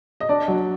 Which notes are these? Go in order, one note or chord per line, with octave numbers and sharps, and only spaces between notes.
D#5
D4 D5
F#3